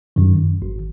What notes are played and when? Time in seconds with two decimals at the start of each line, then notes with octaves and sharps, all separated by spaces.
0.16 F#2 D#3
0.62 G#1